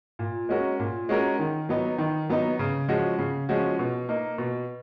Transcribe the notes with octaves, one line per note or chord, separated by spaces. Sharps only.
A#2
G#3 C#4 F#4 A#4
A#2
G#3 C#4 F#4 A#4
D#3
F#3 B3 D#4
D#3
F#3 B3 D#4
C#3
F3 G#3 C#4 F#4
C#3
F3 G#3 C#4 F#4
B2
A#3 D#4
B2